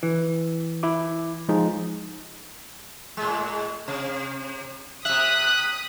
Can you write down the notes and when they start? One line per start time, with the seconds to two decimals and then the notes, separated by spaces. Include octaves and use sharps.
0.03 E3
0.83 E4 D6
1.49 F3 G#3 D#4
3.17 A2 G#3
3.88 C3
5.05 C3 E5 D#6 F#6 B6